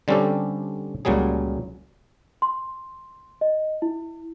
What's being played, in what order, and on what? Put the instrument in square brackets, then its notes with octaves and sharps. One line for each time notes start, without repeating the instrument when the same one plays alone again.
[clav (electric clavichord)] D3 G3 C4 C#4 G4 A4
C#2 A#2 F#3 G3 G#4
[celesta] C6
D#5
E4